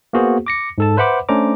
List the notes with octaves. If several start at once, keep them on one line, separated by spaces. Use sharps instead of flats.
A#3 B3 F#4 G#4 C5
D6 A#6 C#7
G#2 A4 A5
B4 C5 E5 F#5 B5 D6
A3 C#4 D4 C5 A#5 D6